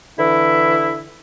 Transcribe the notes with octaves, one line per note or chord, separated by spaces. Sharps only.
D3 E3 E4